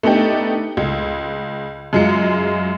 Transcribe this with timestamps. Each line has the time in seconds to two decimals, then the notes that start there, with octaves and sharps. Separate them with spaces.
0.03 A3 B3 D4 D#4 G4
0.77 C#2
1.93 F#2 G#3 F4 C#7